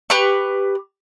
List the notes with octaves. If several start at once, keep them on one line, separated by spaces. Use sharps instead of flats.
G4 B4 C#6